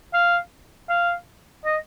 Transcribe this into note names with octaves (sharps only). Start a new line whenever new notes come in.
F5
F5
D#5